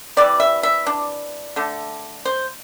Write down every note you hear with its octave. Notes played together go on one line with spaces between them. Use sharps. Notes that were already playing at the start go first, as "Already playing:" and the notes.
C3 E3 G3 D5
E5
E5
D4
D3 A3
C5